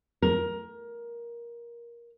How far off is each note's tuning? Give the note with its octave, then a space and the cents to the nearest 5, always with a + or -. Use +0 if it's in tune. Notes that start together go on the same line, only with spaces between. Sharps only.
A#4 +15